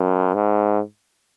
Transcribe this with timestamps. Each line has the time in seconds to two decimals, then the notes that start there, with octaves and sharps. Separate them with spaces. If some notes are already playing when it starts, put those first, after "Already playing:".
Already playing: F#2
0.34 G#2